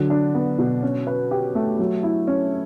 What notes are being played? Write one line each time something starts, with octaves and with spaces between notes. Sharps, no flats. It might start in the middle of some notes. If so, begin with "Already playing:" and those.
Already playing: D3 F#3
D4
B3
B2
C#4
B4
G4
A3
F#3
E4
C#4